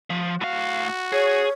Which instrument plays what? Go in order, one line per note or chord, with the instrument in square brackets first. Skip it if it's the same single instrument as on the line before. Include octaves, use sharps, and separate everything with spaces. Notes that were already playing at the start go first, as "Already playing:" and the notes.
[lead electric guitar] F3
[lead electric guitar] A2 F5 [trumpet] F#4
[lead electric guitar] G#4 [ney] C#5